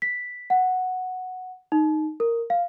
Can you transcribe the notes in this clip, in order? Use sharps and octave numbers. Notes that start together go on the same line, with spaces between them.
B6
F#5
D#4
A#4
F5